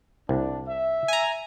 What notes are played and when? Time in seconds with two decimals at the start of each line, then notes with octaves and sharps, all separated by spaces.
0.29 C2 D4
0.67 E5
1.08 G#5 A#5